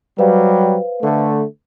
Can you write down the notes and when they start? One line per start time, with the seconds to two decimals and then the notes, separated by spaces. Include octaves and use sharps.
0.18 F#3 G3 B4 C5 F5
1.02 D3 A3